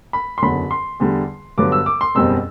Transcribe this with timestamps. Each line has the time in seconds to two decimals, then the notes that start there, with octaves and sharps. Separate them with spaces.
0.13 B5
0.38 C6
0.42 F#1 E2 D3 F#3 B5
0.71 C6
1.00 E2 D3 G3
1.58 G2 D3 F#3 B3 D6
1.72 E6
1.86 D6
2.01 C6
2.15 F#1 E2 B2 G3 C4 E6